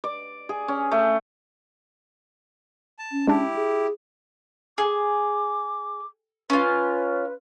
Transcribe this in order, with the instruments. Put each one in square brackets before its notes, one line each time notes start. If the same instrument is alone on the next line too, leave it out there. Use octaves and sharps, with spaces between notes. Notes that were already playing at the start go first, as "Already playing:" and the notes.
[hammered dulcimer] D5
G#4
C#4
A3
[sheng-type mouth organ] A5
[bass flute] C#4
[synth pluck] G#3 D4 A5 [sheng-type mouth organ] E4 G4
[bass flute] G#4
[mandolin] G#4 [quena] D6
[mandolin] C#4 F4 [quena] B4